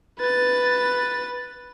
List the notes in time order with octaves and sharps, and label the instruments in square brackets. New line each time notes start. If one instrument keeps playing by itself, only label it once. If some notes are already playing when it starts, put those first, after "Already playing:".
[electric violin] B4 A6